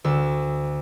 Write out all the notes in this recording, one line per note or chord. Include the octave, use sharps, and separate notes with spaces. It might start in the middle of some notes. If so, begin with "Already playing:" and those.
D2 E6